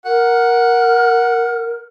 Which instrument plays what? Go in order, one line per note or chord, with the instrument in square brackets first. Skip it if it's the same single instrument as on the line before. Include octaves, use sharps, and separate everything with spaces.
[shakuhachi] A#4 [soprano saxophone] F#5